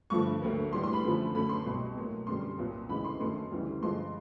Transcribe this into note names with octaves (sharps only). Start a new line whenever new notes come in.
G2 D3 F3 A3 C#6
D2 D3 F#3 A#3
A2 E3 G3 C6
C6
B5
F#2 D3 F3 A3
F#2 D3 F#3 A3 B5
C6
C2 B2 G3
A2 F#3 A#3
F#2 D3 G3 C6
C2 A#2 F#3
D2 C#3 E3 G#3 B5
C6
F#2 D#3 F#3 A3 C6
D2 C#3 E3 G3
G2 D3 F3 G#3 C6